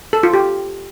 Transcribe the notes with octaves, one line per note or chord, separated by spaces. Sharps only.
A4
F4
G4